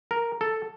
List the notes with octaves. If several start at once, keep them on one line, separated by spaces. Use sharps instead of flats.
A#4
A4